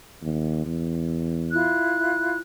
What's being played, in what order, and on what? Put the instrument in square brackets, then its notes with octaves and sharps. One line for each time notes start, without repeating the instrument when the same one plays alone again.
[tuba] D#2
E2
[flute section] E4 F4 F#6